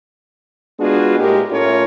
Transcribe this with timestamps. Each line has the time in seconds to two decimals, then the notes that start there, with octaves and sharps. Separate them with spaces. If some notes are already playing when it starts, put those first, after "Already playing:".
0.79 G#3 B3 D4 F4 F#4 G#4
1.19 A2 G#3 A#3 G4 A#4
1.50 A2 A3 C#4 F4 A#4 C#5